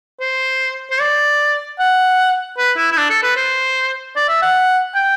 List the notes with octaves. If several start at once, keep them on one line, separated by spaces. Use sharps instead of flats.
C5
C5
D5
F#5
B4
E4
E4
D4
A4
B4
C5
D5
E5
F#5
G5